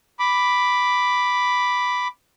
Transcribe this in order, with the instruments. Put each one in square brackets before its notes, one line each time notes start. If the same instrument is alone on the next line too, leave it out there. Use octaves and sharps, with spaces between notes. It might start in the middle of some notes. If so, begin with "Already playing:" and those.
[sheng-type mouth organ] B5 D6